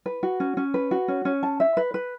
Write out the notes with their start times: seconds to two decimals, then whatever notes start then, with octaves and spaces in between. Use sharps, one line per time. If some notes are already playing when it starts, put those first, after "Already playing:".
0.06 B4
0.23 F#4
0.40 C#4
0.57 C#4
0.74 B4
0.91 F#4
1.08 C#4
1.25 C#4
1.43 A5
1.60 E5
1.77 B4
1.94 B4